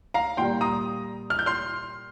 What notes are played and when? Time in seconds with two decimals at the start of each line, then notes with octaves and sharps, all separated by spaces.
0.14 F5 A#5
0.37 A#2 G3 G5 C6
0.61 A#5 D#6
1.30 F6
1.39 G6
1.46 C6 F6